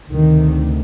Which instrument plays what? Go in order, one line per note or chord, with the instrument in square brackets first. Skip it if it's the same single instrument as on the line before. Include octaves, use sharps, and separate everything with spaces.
[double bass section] D2 C3 D#3